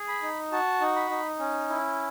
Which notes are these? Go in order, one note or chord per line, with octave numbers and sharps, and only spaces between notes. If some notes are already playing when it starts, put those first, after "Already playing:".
Already playing: G#4
B5
D#4
F#4 A5
D#4
B5
D#4
C#4
E4